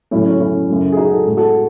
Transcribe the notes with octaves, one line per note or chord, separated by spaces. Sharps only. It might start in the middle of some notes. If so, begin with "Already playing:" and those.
A2 F#3 A3 C#4 E4
C#4
C#4 E4
F#2 C#3 F#3 A3
G#4
D#4 F#4
A4
A2 G#3
F#4 A4